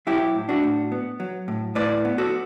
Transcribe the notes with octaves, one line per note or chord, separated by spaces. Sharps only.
F#3 E4 G4
A2
D4 F#4
A2
B3
F#3
A2
A2 B4 D5
B3
F#4 A4